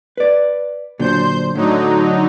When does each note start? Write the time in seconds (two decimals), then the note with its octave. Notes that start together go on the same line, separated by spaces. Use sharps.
0.17 B4 D5
0.99 A#2 D3 F#3 C5 G6
1.55 A2 D3 F#3 D#4